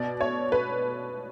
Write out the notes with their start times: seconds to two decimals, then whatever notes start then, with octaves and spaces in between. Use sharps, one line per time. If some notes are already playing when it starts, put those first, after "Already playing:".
Already playing: B2 D5
0.21 C#5
0.52 B4